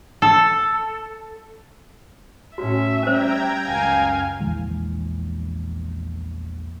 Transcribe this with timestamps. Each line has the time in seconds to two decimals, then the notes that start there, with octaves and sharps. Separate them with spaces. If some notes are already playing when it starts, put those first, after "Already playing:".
0.22 A4
2.58 A2 C#4 F#4 E5
3.03 G3 C#4 C5 G5 A#5 G#6
3.67 C#2 F#2 F5 G#5
4.40 A#1 E2 E3 G#3